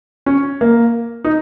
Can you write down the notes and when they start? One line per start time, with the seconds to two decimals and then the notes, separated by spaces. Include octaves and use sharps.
0.26 C#4
0.61 A#3
1.24 D#4